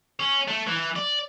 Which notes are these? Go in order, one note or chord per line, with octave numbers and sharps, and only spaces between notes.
C#4
A3
E3
D5